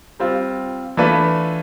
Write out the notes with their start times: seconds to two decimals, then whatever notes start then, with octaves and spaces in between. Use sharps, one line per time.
0.19 G3 C4 F4
0.97 E3 A3 D4 F4 B4